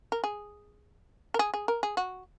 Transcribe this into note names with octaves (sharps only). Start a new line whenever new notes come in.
A#4
G#4
A#4
G#4
G#4
A#4
G#4
F#4